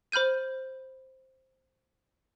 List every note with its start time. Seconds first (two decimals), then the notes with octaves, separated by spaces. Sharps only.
0.12 C5 B5 F6 G6 D#7